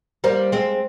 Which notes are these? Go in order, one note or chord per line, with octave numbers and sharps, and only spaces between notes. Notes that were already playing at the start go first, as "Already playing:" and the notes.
G3 A#3 C5
G#3 C4